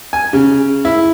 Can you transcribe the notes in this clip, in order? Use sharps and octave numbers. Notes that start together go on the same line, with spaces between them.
G#5
C#3
E4